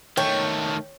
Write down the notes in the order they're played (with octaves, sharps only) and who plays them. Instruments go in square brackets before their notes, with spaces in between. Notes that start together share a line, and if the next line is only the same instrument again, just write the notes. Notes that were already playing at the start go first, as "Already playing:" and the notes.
[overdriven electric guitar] D#3 A3 [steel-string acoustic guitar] C#5 [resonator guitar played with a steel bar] G5